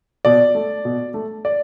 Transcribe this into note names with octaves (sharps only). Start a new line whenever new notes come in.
B2 D5
A3
B2
A3
D5